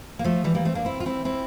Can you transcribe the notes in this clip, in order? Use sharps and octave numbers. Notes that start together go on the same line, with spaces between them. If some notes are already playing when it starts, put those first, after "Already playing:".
A#3
F3 A3
E3 G3
G3 A#3
A3 C4
A#3 D4
C4 E4
F4
C4 E4
C4 E4